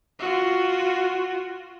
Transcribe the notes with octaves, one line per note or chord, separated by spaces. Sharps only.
F4 F#4